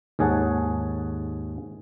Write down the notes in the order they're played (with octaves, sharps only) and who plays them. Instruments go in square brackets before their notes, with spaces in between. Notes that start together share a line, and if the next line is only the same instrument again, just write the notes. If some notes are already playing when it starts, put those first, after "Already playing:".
[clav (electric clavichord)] D#2 G#2 G#4 C#5 F#5 A5